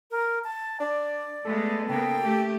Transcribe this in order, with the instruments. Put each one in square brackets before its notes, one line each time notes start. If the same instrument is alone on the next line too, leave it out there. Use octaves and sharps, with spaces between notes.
[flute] A#4
A5
[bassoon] D4 [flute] D5
[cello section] G#3 A3 B3 [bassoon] A4
[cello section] C#3 A#3 B3 [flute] G5
[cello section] A3 G4